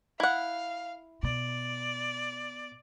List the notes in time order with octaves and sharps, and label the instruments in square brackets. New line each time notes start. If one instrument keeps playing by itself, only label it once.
[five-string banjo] E4 F#5 [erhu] F5
[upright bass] B2 [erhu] D5